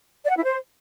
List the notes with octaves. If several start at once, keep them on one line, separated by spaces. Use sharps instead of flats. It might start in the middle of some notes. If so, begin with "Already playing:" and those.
D5
F#5
E4
C5